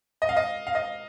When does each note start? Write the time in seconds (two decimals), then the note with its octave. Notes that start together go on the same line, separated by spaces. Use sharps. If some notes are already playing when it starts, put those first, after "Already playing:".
0.22 D#5
0.29 F5
0.37 D#5
0.67 F5
0.75 D#5